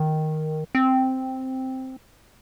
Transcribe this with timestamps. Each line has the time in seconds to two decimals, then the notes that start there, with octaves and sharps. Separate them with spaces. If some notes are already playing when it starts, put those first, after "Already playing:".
Already playing: D#3
0.75 C4